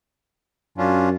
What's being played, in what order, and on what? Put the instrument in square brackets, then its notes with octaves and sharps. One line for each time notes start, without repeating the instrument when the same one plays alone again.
[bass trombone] F#2 [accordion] C#4 D4 F4